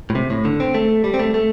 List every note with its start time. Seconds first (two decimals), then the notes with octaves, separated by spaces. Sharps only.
0.10 A2
0.15 C3
0.30 A2
0.45 D3
0.60 C4
0.74 A3
1.04 G3
1.14 C4
1.19 A3
1.34 A3